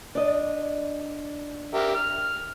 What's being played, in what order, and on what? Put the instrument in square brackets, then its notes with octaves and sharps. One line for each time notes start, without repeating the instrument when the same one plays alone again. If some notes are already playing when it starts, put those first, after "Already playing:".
[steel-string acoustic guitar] D4 D#5
[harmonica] G4 A#4 E5
F6